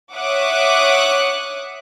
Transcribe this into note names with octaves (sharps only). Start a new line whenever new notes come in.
C#5 E5 F#5 D6 D#6 F#6